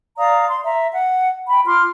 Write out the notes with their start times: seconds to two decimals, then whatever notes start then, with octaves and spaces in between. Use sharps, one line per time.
0.18 D5 F5 A#5 D#6
0.49 C6
0.64 E5 A#5
0.92 F#5
1.49 G5 B5
1.66 F4 C6 D6 F6